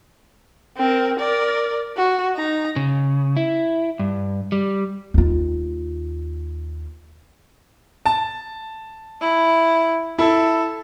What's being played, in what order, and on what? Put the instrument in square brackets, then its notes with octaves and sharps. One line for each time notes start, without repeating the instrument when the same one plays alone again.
[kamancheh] C4 A#4
A#4 D5
F#4
D#4 A#5
[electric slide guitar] C#3
E4
G2
G3
[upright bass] D#2 F4
[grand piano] A5
[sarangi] E4
[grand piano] E4 [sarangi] A4